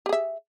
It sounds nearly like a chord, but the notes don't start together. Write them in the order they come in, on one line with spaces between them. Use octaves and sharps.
G4 G#4 E5